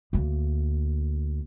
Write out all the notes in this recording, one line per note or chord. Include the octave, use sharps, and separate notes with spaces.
D2 A#3